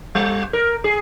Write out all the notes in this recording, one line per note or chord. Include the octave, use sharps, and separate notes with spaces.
G3
A#4
G#4